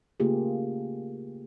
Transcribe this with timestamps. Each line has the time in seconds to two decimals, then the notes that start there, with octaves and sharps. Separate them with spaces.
0.20 C#3 A3 A#3 F4 G4 G#4